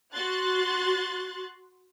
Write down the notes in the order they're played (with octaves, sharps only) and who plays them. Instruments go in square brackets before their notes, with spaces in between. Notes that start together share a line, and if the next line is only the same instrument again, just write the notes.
[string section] F#4 C6 F#6 A6